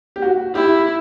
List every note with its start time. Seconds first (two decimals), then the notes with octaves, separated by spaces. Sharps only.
0.16 G4
0.22 F#4
0.55 E4 G4